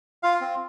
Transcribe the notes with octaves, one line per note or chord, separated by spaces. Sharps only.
F4 F5
C4